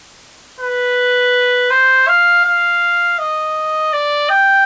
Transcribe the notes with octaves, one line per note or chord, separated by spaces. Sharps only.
B4
C5
F5
F5
D#5
D5
G5